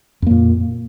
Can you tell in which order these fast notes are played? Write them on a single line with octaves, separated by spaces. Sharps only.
F2 A#3 A#2